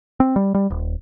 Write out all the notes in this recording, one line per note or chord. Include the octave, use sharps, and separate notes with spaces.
C4
G3
G3
D#1